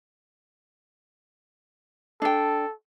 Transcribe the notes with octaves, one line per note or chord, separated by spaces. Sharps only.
D4 A4 G5